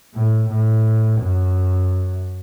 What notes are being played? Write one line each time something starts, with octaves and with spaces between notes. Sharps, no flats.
A2
A2
F#2